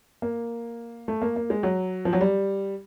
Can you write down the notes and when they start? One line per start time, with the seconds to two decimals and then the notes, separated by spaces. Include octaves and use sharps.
0.22 A#3
1.08 A3
1.22 A#3
1.36 A#3
1.50 G#3
1.63 F#3
2.05 F3
2.13 F#3
2.21 G3